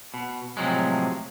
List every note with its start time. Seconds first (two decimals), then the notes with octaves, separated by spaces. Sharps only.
0.14 B2
0.57 A2 C3 F3 F#3 G#3